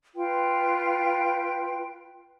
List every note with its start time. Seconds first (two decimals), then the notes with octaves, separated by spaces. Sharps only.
0.16 F4 B4 G5